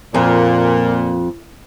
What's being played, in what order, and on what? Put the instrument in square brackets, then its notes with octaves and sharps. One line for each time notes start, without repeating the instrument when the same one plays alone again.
[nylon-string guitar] F2 [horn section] A#2